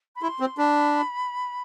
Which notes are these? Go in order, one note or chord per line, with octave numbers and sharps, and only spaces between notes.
B5
E4 C6
C4
D4 B5